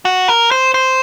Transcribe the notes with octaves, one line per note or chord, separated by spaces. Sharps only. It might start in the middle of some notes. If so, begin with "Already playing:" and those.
F#4
A#4
C5
C5